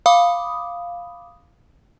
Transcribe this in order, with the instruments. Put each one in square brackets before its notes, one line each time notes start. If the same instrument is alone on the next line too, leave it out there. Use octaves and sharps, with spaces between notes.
[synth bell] F5 B5 D6 D#6